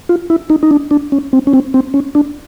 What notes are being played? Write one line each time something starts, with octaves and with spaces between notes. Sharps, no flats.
F4
E4
D#4
D#4
D4
D4
C#4
C4
C#4
C4
C4
C#4
D4